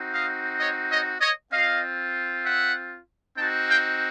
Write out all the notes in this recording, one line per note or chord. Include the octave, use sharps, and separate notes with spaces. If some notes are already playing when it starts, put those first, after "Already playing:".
Already playing: C4 D#4 F#4
D#5 F5
C#5 D#5
C#5 D#5
C#5 D#5
C4 F4 D#5 F5
E5 F#5
C4 D#4 F#4 G5 A5
F5 G5